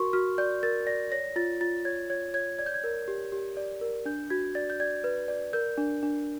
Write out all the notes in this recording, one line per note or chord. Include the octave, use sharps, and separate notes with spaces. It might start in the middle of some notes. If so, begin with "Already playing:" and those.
Already playing: F#4 A#4 C6 C#6
F#4 F6
D5 G6
A#4 A6
D5 A#6
C#5 A#6
F4 A6
F4 A6
C#5 G#6
C#5 G#6
C#5 G#6
D5 G#6
G6
G#6
A#4
G4
G4
D5
A#4
D4 G6
F#4 G#6
D5 A6
G6
D5 G#6
B4
D5
A#4 G6
D4
D4